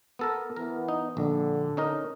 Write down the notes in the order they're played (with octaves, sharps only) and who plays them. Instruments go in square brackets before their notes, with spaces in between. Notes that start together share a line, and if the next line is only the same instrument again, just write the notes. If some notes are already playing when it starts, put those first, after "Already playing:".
[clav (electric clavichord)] B3 A4 A#4
[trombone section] E3 B3 [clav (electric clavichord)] A#4
[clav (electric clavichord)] D#4
[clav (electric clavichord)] A#1 [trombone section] D3
[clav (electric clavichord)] C#4 D#4 A#4